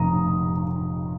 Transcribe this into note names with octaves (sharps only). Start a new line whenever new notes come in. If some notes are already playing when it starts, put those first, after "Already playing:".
Already playing: F1 A#5 D#6